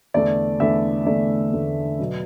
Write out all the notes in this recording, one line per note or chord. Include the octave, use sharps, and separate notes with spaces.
E2 D3 A3 D5
E2 D3 A3 E5
E2 D3 A3 D5
E2 D3 A3
B2 F#3 B3